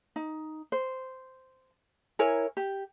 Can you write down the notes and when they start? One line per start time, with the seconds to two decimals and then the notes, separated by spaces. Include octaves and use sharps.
0.16 D#4
0.72 C5
2.19 E4 A#4 C#5 G#5
2.57 G4